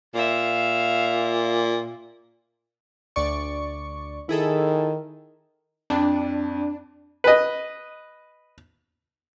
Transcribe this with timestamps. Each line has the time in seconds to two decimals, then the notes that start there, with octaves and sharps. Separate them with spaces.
0.14 A#2 E5 F5
3.16 D2 D5 C#6
4.29 D#3 E4 G#4 A4
5.90 F2 D4
7.24 B4 D#5